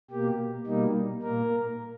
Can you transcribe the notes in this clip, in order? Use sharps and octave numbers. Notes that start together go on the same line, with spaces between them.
B2 A#3 G4
B2 G3 A#3 D#4
A#2 A#3 A#4